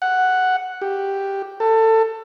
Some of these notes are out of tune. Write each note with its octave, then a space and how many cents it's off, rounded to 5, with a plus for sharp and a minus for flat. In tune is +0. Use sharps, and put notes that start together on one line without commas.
F#5 +0
G4 +0
A4 +25